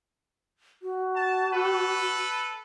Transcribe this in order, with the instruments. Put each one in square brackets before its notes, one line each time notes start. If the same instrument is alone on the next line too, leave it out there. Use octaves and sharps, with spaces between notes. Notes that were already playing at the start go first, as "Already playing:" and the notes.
[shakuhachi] F#4
[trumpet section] A5
A4 B4